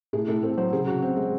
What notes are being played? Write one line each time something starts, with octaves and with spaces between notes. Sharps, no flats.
A2 G#4
A2 A4
C4 A4
F#3 C5
C#3 G#4
C#3 F#4
C4
G#3